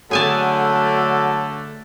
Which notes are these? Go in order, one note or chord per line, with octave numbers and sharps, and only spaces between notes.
D3 F#3 A3 G#4 G#5 A5